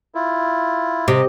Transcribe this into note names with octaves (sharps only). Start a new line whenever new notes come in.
E4 F4
C3 D#5